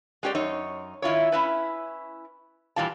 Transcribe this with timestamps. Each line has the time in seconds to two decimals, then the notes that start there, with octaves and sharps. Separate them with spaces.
0.23 G#3 C#4 G4 C#5 D5
0.35 F#2 D#4 C#5
1.02 D#3 E4 F4 C#5
1.32 C#4 E4 B4
2.76 A#2 E3 G3 F4 A5